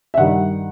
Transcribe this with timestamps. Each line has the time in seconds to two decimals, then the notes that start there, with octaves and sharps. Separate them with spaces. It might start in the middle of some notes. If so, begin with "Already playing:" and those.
0.14 E5
0.18 G2 D#3 G3 F#5